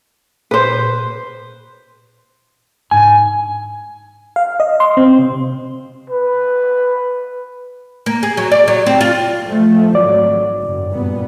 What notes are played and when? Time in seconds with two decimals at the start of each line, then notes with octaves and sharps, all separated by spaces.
0.51 A#2 B4 C5
2.91 G#2 D4 G#5
4.36 F5
4.60 D#5
4.80 C6
4.97 C4
5.19 C3
6.10 B4
8.06 A#3
8.23 G#4
8.37 F#3
8.52 D5
8.68 F#3
8.86 C4
9.01 F4
9.46 F3 A3
9.95 G#1 F#3 D5
10.59 F#1 F#2
10.89 G2 A#2 B3